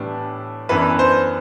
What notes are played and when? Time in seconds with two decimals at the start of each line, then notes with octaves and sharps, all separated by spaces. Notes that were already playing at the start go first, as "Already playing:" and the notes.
Already playing: A2 E3 G3 B3 D4
0.69 F#2 E3 B3 D4 B4
0.99 C5